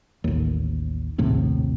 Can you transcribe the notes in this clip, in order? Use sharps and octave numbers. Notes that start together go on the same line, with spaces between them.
A1 D#2
A#1 D#2 A2 C3